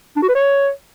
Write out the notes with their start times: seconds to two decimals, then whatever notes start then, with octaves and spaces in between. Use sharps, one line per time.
0.16 D4
0.22 F#4
0.29 B4
0.35 C#5